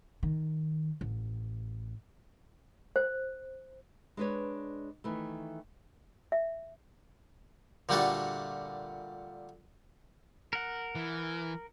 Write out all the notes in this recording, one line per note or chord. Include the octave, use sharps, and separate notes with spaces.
D#3
A1
C5
G#3 D4 B4 C#5
D#3 E3 A3
E5
A#2 D3 G3 A3 F#4 A4
A#4 F#5
E3